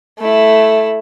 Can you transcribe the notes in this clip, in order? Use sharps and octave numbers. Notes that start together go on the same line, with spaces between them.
A3 E4